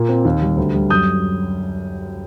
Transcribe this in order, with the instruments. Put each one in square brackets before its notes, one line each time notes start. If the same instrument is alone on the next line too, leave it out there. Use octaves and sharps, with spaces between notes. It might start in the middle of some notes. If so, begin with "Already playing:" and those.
Already playing: [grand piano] A#2 A#3
C4
D#2
G3
D2
G3
F#2 D#6 G6